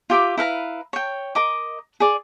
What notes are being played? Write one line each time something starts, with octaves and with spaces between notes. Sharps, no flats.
F4 G4 E5 D6
E4 B4 F5 A#5
C#5 G5
A#4 D#5 D6
G#4 D5